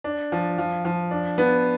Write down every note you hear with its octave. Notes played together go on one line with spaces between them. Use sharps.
D4
F3
F3
F3
D4
B3